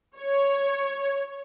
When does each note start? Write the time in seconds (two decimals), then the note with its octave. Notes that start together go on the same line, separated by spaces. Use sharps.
0.17 C#5